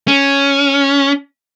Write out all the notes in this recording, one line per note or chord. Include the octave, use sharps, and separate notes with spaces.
C#4